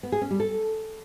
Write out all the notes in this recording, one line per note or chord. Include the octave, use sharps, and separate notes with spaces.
B3
G#4
C#4
G3
A4